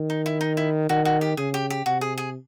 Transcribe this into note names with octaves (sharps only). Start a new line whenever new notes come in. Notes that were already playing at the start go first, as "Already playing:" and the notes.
Already playing: D#3
D#4
E4
D#4
E4
D#3 F#4
F#4
G4
C#3 G#4
G4
G4
C3 F#4
G#4
G#4